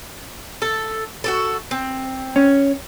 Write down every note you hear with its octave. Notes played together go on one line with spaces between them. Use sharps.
A4
F#4 G4 A4
C4
C#4